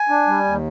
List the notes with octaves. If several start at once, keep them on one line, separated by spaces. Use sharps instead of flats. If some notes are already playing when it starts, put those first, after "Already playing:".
Already playing: G#5
D4
G3
D#2